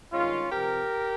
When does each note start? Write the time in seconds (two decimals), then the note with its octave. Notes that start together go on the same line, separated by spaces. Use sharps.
0.13 G2 D#3 G#3 C#4 F4
0.51 C3 F3 C4 G4 A#4